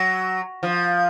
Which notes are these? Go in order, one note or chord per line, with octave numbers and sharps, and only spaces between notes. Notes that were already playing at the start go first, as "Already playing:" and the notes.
Already playing: F#3
F3